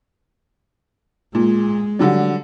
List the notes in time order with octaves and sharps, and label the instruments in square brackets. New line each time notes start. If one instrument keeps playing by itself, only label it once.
[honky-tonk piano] A#2 [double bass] G#3
[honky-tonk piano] D3 F#3 G3